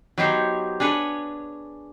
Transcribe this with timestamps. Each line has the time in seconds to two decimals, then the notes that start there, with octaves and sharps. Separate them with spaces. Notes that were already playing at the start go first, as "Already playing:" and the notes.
0.18 F#3 B3 D#4 G4 C5 C#5
0.80 D4 G#4 B4 C#5